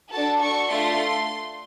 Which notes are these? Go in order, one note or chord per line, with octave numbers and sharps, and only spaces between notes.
D4 F#4 A4 A5
D4 F#4 A4 C#6
A3 D4 F4 A4 C6